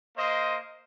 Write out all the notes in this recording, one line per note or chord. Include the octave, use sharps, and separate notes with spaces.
A#3 C5 D#5